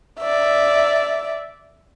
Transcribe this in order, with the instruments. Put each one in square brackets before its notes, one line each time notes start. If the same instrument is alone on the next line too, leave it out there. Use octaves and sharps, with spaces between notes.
[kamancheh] D5 E5